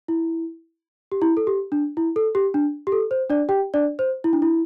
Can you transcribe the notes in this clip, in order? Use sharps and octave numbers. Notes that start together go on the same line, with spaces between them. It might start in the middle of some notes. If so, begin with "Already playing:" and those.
E4
G4
E4
A4
G4
D4
E4
A4
G4
D4
G4
A4
C5
D4 D5
G4 G5
D4 D5
C5
E4
D4
E4